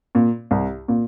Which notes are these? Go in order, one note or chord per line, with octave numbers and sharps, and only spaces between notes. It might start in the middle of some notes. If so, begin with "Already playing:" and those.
A#2
C2
A#2